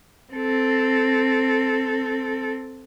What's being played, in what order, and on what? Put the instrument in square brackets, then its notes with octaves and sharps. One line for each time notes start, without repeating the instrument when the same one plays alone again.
[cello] C4 A4